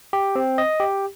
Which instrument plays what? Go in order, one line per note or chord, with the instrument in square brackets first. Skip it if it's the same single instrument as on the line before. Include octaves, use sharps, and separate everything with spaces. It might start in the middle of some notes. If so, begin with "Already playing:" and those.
[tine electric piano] G4
C4
D#5
G4